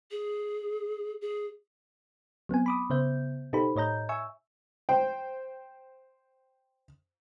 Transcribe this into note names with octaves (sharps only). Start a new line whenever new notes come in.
G#4
G#4
F#3 B3 C4 G#5
B5 D6 D#6
C#3 B3 C5 E5 G6
B2 D#4 G4 A4 C5 B5
A2 C#5 D#5 A#5 G6
E5 G#5 C#6 E6
C5 G5